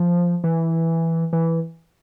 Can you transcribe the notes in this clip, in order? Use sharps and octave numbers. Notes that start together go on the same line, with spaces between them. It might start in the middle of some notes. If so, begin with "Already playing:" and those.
Already playing: F3
E3
E3